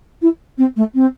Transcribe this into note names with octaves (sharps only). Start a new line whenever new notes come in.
E4
C4
A3
C4